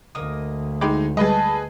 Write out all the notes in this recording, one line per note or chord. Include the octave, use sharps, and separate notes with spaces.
D2 A#3 D#5 D#6
G#3 D#4 G5 B5 D6
G3 G#3 G#4 A4 B4 D#5 A5